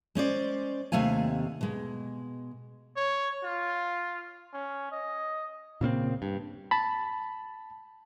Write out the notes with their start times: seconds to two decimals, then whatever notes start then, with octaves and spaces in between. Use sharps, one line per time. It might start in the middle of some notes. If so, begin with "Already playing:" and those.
0.15 G#3 C#4 C5 D5
0.92 D#2 C3 A3 F5 G#5
1.61 B2 G#3
2.96 C#5
3.44 F4
4.53 C#4
4.92 D#5
5.81 A#2 C#3 A#3 C4
6.22 G2
6.71 A5 B5